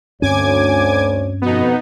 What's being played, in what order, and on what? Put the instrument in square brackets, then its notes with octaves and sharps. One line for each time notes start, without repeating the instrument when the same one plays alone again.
[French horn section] D2 C#5 [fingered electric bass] G2 C4 C#4 [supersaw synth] G#5 D6 G#6
[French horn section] F2 B2 [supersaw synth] B3 D#4